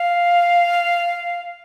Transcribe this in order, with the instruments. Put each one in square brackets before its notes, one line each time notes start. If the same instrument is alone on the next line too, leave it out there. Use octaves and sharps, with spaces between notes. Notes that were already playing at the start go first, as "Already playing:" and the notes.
Already playing: [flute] F5